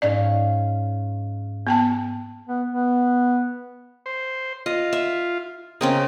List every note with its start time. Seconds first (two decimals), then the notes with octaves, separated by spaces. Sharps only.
0.02 G#2 C#4 D5 F5
1.67 B3 G5 A5
2.47 B3
2.70 B3
4.06 C5
4.66 F4 D#5
4.93 E5
5.81 C#3 C4 C#4 A#4 D#5